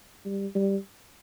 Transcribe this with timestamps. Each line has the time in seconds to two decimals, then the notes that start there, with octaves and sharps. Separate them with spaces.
0.25 G3
0.55 G3